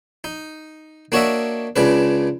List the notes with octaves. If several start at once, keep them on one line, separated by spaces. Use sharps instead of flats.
D#4
A#3 D4 F#4 C#5 D#5 E5
C#2 C#3 D4 B4